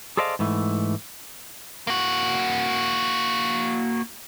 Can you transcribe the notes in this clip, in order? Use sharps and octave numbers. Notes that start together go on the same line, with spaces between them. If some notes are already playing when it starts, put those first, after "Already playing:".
G#4 A4 C5 D5 D#5 F5
G#2 E3 A3
A#3 F#4